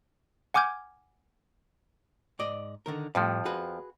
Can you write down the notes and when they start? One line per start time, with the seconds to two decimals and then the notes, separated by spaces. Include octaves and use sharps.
0.54 F#5 G#5 D6 F6 G6 G#6
2.39 G#2 D5 D#5
2.86 D3 D#3 A#4
3.15 F2 A2 F3 G3
3.45 F#4 G#4 B4